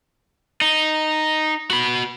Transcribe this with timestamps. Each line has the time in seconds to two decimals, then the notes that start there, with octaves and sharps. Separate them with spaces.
0.61 D#4
1.71 F#4 B5